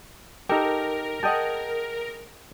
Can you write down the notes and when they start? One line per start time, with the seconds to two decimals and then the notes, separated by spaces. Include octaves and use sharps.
0.49 D#4 G4 A4 A#4
1.23 G#4 D#5 F#5 G5 A5